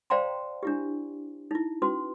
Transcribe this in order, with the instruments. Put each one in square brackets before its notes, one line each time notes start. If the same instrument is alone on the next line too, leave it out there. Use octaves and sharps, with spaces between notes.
[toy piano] C5 D5 F5 G5 A#5 C6
D4 E4 G4
D#4 E4
C#4 F#4 B4 C6